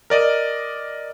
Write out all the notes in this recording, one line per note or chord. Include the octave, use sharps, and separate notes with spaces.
A#4 D5 D#5